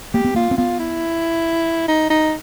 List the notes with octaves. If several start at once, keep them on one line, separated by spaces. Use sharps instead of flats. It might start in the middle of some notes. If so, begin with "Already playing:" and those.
A#3 G4
B3
A#3 F4
C4
B3 F4
E4
D#4
D#4